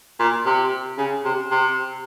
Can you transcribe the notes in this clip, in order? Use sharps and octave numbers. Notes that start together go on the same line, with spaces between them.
A#2
C3
C#3
C3
C3